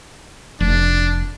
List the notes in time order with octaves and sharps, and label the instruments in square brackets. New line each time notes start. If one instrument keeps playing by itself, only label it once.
[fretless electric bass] F1 [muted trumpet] D4